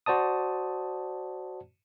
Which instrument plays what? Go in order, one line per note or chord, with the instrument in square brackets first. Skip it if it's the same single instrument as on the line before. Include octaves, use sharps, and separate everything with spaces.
[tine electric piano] F#4 C5 D5 A5 D#6